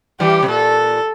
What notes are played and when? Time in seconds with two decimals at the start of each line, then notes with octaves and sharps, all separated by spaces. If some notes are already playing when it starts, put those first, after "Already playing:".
0.20 E3 G3 G4
0.43 C3
0.48 A#2 A4